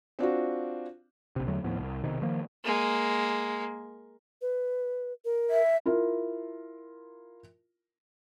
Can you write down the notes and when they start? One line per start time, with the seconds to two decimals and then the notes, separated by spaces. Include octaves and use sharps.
0.19 C4 D4 F4 F#4
1.36 A#1 C3
1.48 E2 D3 F#3 A3
1.64 D#2 A2 F3 B3
1.79 C2
2.04 B1 C3 D#3
2.22 D#3 F3 A#3
2.64 G#3 A#3
4.42 B4
5.25 A#4
5.50 E5
5.86 E4 F4 A#4